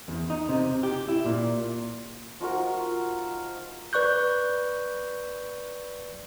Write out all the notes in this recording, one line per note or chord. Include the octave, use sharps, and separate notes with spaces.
E2
D#4
C3
G4
E4
A#2
F3 D#4 F#4 A#4
B4 D5 C#6 F#6 G6